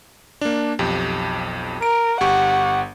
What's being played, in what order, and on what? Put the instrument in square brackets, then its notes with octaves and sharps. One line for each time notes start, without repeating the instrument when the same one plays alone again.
[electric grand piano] A#3 D4
B1 F2 G4
[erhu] A#4 [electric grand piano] D7
[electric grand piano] G1 G4 C#6 [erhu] F#5